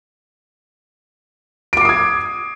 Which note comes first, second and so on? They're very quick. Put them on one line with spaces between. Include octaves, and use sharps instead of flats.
D7 D6 C7 D#6 G#6